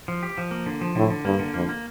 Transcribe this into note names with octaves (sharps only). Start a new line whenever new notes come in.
F3
G4
F3
A#3
D3
F3
A2 D3
D3
G2 A#3
D3
F2 A#3
A#3